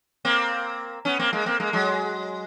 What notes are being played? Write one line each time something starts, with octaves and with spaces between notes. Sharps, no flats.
A#3 C4
B3 C#4
A#3 C4
G#3 A#3
A#3 C4
G#3 A#3
F#3 G#3